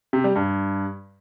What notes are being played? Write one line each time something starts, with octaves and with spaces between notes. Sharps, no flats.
C3
G3
G2